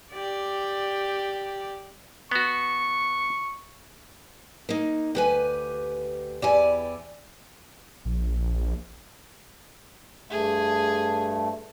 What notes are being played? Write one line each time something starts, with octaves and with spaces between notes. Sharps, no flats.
G4 D5
B3 F#4 C#6
A#3 D#4
D2 G4 B4 G#5
E2 E4 G4 D5 G#5
A#1
G2 A3 G#4